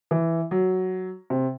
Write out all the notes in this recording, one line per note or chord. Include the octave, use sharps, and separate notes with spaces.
E3
F#3
C3